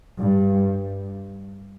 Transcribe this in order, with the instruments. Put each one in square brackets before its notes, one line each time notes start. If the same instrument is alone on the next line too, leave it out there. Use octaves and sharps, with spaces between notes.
[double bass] G2